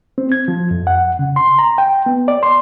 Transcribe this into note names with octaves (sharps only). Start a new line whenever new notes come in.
C4
G#6
F3
F2
F#5
C#3
C6
A#5
G5
B3
D5
C6